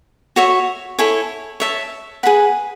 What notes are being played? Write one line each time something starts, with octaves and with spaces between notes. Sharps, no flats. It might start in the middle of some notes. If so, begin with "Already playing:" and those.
F#4 C#5 E5
E4 A4 C#5 G#5
C#5 E5 A5
G#4 B4 F#5 B5